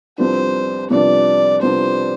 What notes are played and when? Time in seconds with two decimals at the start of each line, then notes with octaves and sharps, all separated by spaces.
0.18 C2 C3 F3 B3 D4 C5
0.90 C2 C3 F3 B3 D4 D5
1.62 C2 C3 F3 B3 D4 C5